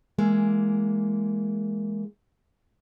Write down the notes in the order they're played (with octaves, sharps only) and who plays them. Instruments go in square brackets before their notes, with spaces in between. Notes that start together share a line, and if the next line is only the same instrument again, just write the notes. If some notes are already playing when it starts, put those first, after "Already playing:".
[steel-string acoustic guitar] E3 G#3 A#3